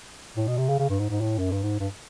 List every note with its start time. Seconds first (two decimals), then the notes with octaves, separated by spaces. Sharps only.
0.37 A2
0.48 B2
0.58 C3
0.69 C#3
0.79 C#3
0.89 G2
1.00 G#2
1.10 G#2
1.21 A2
1.38 F#2
1.52 G2
1.63 G#2
1.80 G2